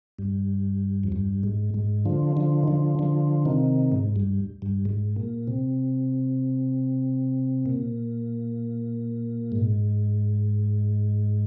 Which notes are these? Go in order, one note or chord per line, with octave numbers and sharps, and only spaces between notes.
G2
F2
G2
G#2
G#2
D3 F3
D3 F3
D#3
D3 F3
D3 F3
C3 D#3
G#2
G2
G2
G#2
A#2
C3
A#2
G#2